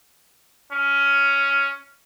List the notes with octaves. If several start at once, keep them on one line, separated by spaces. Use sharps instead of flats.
C#4